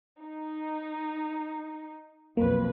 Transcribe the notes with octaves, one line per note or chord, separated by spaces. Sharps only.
D#4
B1 F2 A#3 B4